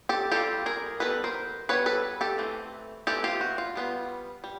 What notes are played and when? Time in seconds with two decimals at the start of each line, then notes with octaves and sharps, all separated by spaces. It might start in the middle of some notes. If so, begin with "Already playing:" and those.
0.09 G4 A4
0.32 G3 C4 F4 G4 A4
0.66 G#4 A#4
1.00 G3 B3 D#4 A4 B4
1.24 A#4 C5
1.69 G3 B3 D#4 B4 C#5
1.86 A4 B4
2.21 G4 A4
2.38 E3 A3 C4
3.07 E3 A3 C4 G4 A4
3.24 F4 G4
3.41 F#4
3.58 F4
3.76 G3 B3 D4 F4
4.44 G3